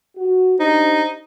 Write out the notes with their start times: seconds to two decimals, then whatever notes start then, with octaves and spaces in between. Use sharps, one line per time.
0.17 F#4
0.60 D4 D#4 G4 C5